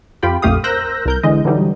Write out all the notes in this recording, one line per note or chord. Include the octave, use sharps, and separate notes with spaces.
F2 F4 G4 G5 B5
A#1 F2 A3 G4 F5 D#6
A#4 C5 E6 F#6 G6 A#6
C2 A#4 G6
D3 E3 G#3 D#5
D3 E3 F#3 G3 D#4